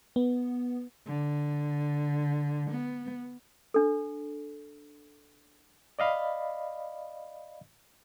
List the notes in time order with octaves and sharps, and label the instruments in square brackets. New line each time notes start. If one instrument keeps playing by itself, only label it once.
[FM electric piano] B3
[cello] D3
B3
[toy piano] D4 A4
[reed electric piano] D5 D#5 F5 B5